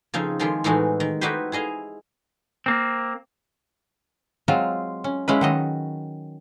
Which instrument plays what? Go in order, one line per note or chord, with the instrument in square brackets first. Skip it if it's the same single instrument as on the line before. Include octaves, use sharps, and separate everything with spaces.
[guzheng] C#3 F3 C4 D#4 G#4
D#3 F3 G#3 E4 F4 G4
A2 E3 G#3 A3 D#4 F#4
D#3
D#4 E4 F#4 G4 B4 C5
E4 G#4 D#5 F5
[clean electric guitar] A#3 C4
[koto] F#3 G#3 C4 F4 F5 A#5
C#4
G#3 C#4 E4 F4 B4
D#3 F#3 D#5